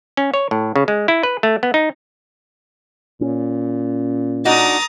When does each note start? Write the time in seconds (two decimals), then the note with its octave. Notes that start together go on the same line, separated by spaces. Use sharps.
0.17 C#4
0.34 C#5
0.51 A2
0.76 C#3
0.88 G#3
1.08 E4
1.23 B4
1.43 A3
1.63 B3
1.74 D#4
3.21 A#2 C#4
4.45 D4 D#4 F#4 A#5 D#6 A6